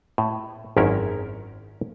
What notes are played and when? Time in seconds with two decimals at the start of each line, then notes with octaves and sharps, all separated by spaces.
0.18 A2
0.77 G#1 F#2 D#3 C#4 E4 A#4